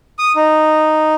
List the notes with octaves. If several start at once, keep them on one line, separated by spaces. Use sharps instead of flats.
D#6
D#4